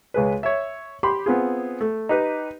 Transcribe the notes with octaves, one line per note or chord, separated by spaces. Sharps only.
C#2 G#3 B4
C#5 E5
G4 B5 C6
B3 C4 F4 G#4
A3
D#4 G4 B4